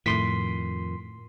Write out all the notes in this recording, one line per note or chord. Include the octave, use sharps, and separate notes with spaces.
F2 A2 D#3 C6 B6